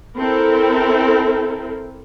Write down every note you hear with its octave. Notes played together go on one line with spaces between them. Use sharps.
C4 E4 A4 A#4